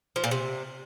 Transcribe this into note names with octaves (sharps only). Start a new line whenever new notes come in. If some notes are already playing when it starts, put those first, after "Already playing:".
F3
A#2
C3